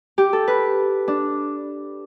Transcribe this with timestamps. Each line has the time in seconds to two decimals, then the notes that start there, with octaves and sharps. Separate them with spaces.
0.18 G4
0.33 A4
0.48 B4
1.08 D4